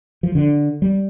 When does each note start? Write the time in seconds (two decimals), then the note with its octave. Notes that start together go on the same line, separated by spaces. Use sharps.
0.23 F3
0.35 D3
0.82 G3